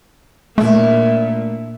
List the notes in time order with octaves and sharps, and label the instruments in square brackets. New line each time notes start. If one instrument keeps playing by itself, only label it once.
[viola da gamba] A#2 [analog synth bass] A3 [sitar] D4 E4